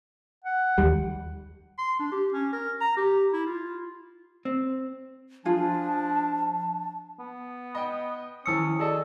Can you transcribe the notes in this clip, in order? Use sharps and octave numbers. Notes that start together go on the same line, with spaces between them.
F#5
D#2 G3
C6
D4
G4
C#4
A#4
A#5
G4
E4
F4
C4
F3 D4 F4 G#4 A5
B3
D#5 G5 B5
D#3 F3 C#4 E4 D#6 E6 C#7
G#4 A4 D5 D#5